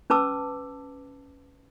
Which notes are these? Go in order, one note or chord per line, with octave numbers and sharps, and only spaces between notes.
C#4 B4 A5 D6 E6